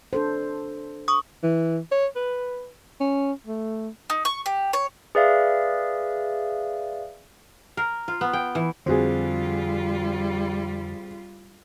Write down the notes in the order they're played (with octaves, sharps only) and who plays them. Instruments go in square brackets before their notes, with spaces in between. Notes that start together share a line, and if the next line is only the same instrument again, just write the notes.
[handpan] D4 A4 C5
[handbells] C#6 D#6
[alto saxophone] E3
C#5
B4
C#4
A3
[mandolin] D#4
C#6
G4
C#5
[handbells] G#4 B4 D5 E5 F5
[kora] A#4
F4
B3
G5
E3
[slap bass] F2 D3 [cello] G3 F4 [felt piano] C4 F#4 G#4